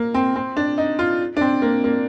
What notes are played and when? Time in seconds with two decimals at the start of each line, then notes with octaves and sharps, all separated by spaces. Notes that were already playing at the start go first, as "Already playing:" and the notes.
Already playing: A#3
0.14 C4
0.36 C4
0.57 D4
0.78 D#4
0.99 F4
1.37 D4
1.41 C4
1.62 A#3
1.84 A#3